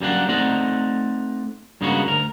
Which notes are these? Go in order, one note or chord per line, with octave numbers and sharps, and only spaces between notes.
F#2 G3 A#3 D4 F#5
A3 C4 D#4 D5 D#5 F#5
G2 C#3 G#3 A#3 B3 F#4
D2 A#4